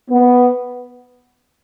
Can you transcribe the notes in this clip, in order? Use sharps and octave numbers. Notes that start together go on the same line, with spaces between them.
B3